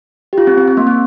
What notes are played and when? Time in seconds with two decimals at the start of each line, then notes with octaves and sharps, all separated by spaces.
0.33 G4
0.38 F4
0.47 C4
0.58 C4
0.68 C4
0.77 A#3
0.87 C4